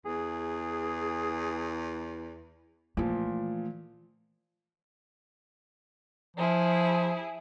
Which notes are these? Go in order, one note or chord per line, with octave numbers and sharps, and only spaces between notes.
E2 G#4
A#2 E3 F3 A3
F3 E4 G#4